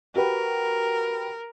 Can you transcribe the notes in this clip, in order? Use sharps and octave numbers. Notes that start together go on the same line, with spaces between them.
F#4 G4 A#4 B4